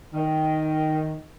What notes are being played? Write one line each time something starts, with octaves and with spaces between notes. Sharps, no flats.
D#3